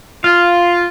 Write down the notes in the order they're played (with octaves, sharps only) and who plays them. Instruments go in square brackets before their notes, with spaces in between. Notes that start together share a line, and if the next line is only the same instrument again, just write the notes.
[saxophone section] F4 [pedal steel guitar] F5